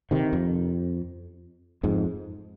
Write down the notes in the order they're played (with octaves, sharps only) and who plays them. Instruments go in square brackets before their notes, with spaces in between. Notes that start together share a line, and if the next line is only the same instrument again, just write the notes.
[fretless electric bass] C3 D#3
F2
F2 G#2